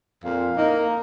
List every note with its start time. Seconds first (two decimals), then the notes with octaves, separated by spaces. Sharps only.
0.24 F2 A#2 F5
0.57 A#3 D#4 A#4